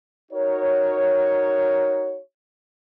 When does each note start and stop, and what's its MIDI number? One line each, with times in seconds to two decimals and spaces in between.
0.32 2.19 63
0.32 2.19 66
0.32 2.19 70
0.32 2.19 73